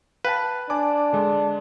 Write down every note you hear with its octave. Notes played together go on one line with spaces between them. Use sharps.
B4 F5 G5 A5
D4 D5 G#5 D6
D3 G#3